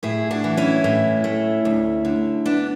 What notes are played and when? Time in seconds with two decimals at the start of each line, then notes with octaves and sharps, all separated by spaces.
0.03 A2 E4 G#4
0.31 D4 F#4
0.44 E3
0.57 C#4 E4
0.84 A2
1.24 A3
1.65 D2
2.05 D3
2.46 B3 D4